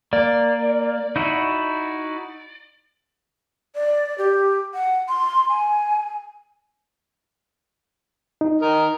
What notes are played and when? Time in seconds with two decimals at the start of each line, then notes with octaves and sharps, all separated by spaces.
0.13 A#3 D5
1.16 D#4 E4 F#4
3.75 D5
4.18 G4
4.74 F#5
5.09 C6
5.49 G#5
8.41 D#4
8.62 A#4 D#5